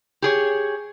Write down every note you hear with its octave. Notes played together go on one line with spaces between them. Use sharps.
G4 G#4 C#5